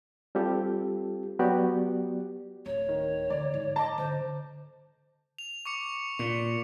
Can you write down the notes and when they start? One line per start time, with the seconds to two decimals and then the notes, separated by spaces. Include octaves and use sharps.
0.35 G3 C4 F4 G4 A4
1.39 F#3 B3 F#4 G4 D5
2.66 D1 C#5
2.89 D#3
3.30 D3 D#3 D5
3.54 G#2
3.76 D#5 A5 D6
3.98 D3 C5
5.38 F7
5.65 C#6 D6 C#7
6.19 A#2 C#7